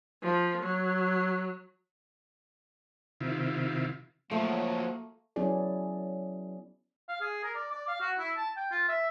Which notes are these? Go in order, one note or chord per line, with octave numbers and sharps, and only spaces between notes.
F3
F#3
C3 D#3 E4 F4
F3 F#3 A3 A#3
F#3 B3 C#4 E4 G#4 D5
F5
G#4
A#4
D5
D5
F5
F#4
E4
A5
G5
F4
E5